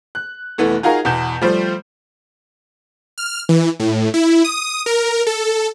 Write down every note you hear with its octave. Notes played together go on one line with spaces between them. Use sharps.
F#6
F1 E3 A3 B3
D#4 F4 F#4 G#4 A#4
E2 B2 G6 E7
F3 G3 A3 C5
F6
E3
A2
E4
D#6
A#4
A4